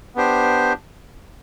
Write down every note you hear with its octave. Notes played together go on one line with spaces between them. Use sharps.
B3 D4 G4 C5